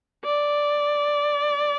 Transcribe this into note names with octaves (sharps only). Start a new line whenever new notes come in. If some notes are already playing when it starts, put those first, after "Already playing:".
D5